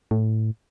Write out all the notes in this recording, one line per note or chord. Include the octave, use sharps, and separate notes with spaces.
A2